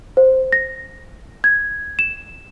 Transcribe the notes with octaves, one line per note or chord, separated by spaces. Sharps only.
C5
A#6
G#6
E7